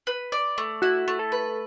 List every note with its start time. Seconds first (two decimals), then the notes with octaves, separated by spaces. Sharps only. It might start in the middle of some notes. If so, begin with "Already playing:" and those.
0.07 B4
0.32 D5
0.58 A3
0.82 E4 F#4
1.08 A3
1.19 A4
1.32 B4